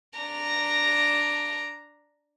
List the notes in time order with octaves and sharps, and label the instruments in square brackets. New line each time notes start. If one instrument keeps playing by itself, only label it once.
[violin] D4 A#5